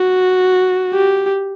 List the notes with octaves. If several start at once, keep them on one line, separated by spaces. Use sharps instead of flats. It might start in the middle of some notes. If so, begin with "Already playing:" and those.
Already playing: F#4
G4